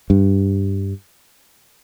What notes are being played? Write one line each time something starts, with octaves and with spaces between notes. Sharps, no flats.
G2